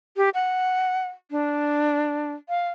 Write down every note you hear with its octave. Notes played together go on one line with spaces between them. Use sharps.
G4
F#5
D4
F5